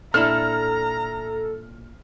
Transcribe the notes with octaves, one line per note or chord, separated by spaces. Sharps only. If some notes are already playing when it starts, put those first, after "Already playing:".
A#2 D4 E4 A4 A#5 F6